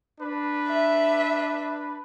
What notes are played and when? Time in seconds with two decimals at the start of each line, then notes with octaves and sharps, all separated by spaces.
0.20 D4 B4
0.68 E5